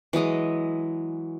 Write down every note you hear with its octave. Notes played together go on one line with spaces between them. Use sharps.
E3 F#3 G#3 D#5